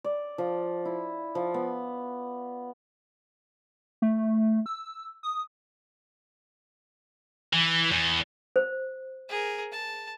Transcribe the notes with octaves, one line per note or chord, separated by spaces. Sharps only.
D5
F3
E4
F3
B3
A3
E6
D#6
E3
E2
C5
G#4 A#4
A5